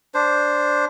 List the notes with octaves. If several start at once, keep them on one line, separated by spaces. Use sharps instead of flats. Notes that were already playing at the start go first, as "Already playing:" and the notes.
D4 C5